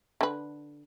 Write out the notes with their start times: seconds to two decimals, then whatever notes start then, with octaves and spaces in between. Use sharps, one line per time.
0.21 D3 B4